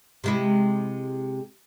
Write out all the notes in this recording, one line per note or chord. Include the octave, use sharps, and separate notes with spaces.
C3 G#3 E4